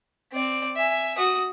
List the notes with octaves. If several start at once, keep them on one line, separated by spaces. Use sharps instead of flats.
C4 D5
E5 G#5
F#4 D#6